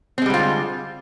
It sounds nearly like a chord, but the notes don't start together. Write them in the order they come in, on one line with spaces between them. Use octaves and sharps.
C4 G#3 G3 D3 F4